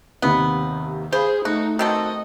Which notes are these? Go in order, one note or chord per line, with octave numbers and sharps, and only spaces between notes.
D#2 C3 D#3 B3
G#4 C5 F5 B5
A3 D#4 F#4
D#3 C4 F#4 A4 D#5